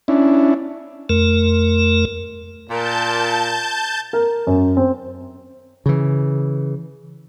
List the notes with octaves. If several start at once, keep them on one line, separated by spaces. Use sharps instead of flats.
C#4 D4 E4
F2 A3 A#4
A#2 A#4 A5 G6
A#4
F#2
C4
C#3 E3